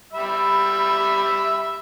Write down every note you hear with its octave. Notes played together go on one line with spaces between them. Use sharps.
G3 E5 B5 E6